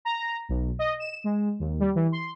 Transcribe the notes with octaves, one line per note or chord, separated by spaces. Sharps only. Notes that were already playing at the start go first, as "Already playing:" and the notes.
A#5
B1
D#5
E7
G#3
D#2
G3
E3
C6